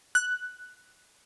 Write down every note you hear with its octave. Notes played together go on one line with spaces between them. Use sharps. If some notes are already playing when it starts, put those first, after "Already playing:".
F#6